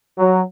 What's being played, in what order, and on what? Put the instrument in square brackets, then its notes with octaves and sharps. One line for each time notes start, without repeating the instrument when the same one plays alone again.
[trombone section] F#3